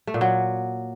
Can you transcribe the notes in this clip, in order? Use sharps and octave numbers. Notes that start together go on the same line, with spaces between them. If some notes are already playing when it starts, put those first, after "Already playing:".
A3
A#2
F#3